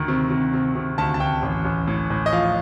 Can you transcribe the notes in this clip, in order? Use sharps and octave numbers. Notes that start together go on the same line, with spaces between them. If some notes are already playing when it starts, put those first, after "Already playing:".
Already playing: D2 D#3
C3
C3
C3
C3
D2 A5
A5
D2 G5
A1
A1
A2
A2
D#5
F3 F5